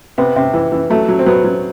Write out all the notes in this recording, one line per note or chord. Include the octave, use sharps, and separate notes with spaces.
C3 B3
C3
E3
E3
F#3 A3
F#3
C4
F#3 B3
F#3